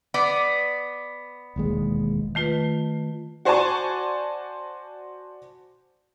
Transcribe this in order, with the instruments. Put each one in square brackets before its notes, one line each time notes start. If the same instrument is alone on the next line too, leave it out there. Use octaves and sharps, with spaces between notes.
[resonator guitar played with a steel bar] B3 D5
[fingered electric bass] E1 D#2 G#3
[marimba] D#3 A3 F4 B4
[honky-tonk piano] F#4 C5 D5 G#5 A5 C#6